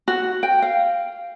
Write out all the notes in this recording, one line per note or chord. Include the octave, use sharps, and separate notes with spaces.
F#4
G5
F5